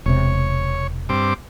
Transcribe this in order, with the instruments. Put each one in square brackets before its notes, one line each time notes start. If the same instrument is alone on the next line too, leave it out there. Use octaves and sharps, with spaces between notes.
[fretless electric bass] E1 C3 [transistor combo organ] C#5
[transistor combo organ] G2 C4 D6